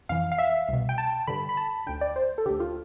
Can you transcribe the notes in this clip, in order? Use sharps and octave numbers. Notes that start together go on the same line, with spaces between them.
F2 E3 F5
F5
E5
C2 B2
G5
A5
G2 D3 B5
B5
A5
D2 D3 G5
D5
C5
A4
D2 D3 G4
F4